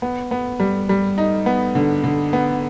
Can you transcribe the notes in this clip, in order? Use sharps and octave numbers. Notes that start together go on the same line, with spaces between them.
B3
B3
G3
G3
D#4
B3
D3
D3
B3